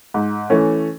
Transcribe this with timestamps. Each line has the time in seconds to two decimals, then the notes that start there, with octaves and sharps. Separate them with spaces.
0.14 G#2
0.50 E3 A3 C#4